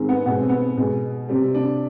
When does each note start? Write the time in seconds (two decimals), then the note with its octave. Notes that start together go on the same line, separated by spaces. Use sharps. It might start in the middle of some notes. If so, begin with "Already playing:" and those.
Already playing: G#2 D#3 G#3 C4
0.09 B3
0.26 B2 G#3 B3
0.37 C4
0.49 B3
0.77 B2 G#3
1.29 C3 G3 C4
1.54 D4